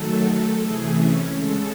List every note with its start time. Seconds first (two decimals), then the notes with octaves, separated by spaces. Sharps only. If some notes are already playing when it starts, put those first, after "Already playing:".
Already playing: D#3 F#3 A3 A4
0.58 C3 E3 A3 G#4
0.94 C#4
1.31 C#3 G#3 A4